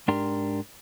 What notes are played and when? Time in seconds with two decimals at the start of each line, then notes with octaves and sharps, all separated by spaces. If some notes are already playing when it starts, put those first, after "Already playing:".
0.08 G#2 D4 G4 A#4 C6